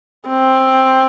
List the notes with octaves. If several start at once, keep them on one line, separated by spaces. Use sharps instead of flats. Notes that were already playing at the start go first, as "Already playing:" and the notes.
C4